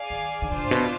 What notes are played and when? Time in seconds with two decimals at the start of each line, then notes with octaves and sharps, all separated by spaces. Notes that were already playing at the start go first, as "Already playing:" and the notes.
Already playing: G#4 D5 F5 G#5
0.10 D#3
0.42 D#3
0.51 D3 D4 F4 C5
0.65 G#2
0.71 B2